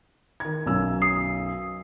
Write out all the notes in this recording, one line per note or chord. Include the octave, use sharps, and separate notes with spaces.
D#3 G#6
B1 F#2 E6
D#6 C7